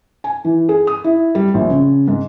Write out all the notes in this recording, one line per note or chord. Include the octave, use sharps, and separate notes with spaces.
G#5
E3
G#4
D#6
E4
G3
A#1
C#3
G#2